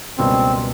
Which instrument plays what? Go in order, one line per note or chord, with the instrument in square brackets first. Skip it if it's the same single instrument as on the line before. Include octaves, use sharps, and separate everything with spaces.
[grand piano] C#2 B2 G3 A#3 [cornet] C4